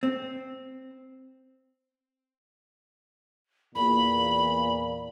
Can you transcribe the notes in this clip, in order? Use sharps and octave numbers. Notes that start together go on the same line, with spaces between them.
C4
E2 A#2 B5